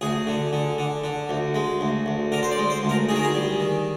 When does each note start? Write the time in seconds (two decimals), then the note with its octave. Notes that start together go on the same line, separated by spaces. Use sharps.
0.01 D2 G#4
0.27 D3
0.53 D3
0.78 D3
1.04 D3
1.29 D2
1.54 G#3
1.81 D2
2.06 D2
2.32 D3 A#4
2.43 C5
2.51 D5
2.57 G#3
2.70 C5
2.83 D2
2.89 A#4
3.09 D#3 G#4
3.16 A#4
3.23 G#4
3.35 G3
3.60 D#3